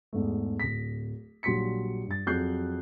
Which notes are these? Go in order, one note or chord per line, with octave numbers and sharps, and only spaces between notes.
E2 G#2 A3
D1 A#6 B6
A#1 F#3 G3 C6 B6 C#7
G2 A6
F2 F#3 G#4 F#6 G6 C7